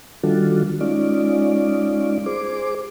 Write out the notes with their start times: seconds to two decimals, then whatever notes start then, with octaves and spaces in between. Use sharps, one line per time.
0.23 D#3 G3 D4 F4 F#4 A4
0.81 G#3 C#4 D#4 F4 D5
2.26 G#4 C5 D6